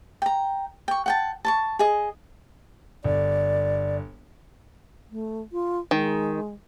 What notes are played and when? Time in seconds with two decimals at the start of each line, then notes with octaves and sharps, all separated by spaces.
0.22 G5 A#5
0.88 G5 C#6
1.06 F#5 G5 A5
1.45 A5 C6 C#6
1.79 G#4 D#5
3.04 G1 D5
5.11 A3
5.52 F4
5.91 D#3 G#3